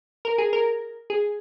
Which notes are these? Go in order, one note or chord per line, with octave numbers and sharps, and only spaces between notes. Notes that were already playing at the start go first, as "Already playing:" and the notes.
A#4
G#4
A#4
G#4